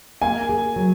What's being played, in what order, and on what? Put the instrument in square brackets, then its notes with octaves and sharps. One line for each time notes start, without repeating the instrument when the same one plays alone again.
[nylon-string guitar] A#3 [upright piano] G#5
[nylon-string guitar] G#4
F#3